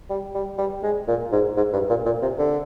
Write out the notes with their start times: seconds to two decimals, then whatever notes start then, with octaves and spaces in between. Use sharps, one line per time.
0.10 G3
0.35 G3
0.58 G3
0.83 G#3
1.08 A#2
1.32 G#2
1.57 G#2
1.73 G2
1.90 A#2
2.06 A#2
2.22 C3
2.39 D3